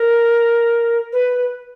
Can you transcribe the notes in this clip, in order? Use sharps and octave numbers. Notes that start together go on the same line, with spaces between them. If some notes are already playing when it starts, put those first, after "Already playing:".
Already playing: A#4
B4